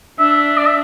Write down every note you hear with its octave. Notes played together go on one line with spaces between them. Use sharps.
D4 E5
D5
E5